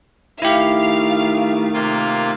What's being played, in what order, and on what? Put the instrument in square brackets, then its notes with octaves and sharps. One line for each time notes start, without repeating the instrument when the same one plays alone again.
[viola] D#3 A3 [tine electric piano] E4 G4 [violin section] F5
[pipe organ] C3 A#3 F4